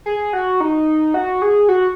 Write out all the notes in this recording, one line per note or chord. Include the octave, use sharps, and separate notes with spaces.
G#4
F#4
D#4
F#4
G#4
F#4